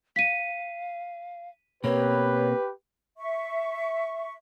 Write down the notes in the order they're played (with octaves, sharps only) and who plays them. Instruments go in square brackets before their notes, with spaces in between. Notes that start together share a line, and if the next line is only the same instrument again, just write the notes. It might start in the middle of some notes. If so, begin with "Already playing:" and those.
[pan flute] F5 [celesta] B6 D#7
[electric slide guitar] B2 A#3 C4 [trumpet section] G4 B4 [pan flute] C#5
[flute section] E5 C#6